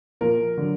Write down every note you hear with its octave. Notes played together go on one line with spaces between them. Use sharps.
A#2 F3 A#4
D3 F#3